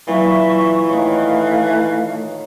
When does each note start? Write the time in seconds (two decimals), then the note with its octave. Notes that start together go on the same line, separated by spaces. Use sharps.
0.07 A#2 E3 F#3 F4 E5 C#6
0.89 D#3 A3 C#5 F5